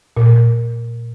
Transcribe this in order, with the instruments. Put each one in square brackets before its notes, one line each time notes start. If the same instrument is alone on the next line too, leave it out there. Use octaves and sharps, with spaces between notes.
[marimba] A#2